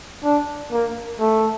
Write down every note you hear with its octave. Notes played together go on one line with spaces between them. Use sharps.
D4
A#3
A3